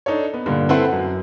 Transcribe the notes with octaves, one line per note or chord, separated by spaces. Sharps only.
D4 D#4 A4 C#5
B3
G2 A#2 D3
C4 E4 A4 B4 F#5 C6
F#2